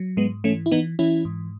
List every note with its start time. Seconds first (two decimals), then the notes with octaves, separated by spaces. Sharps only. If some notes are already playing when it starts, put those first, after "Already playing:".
Already playing: F#3
0.17 G#2 G#3 B3
0.44 E3 A3 C#4
0.66 E4
0.71 E3 B3 D#4
0.99 E3 C#4 E4
1.25 G#2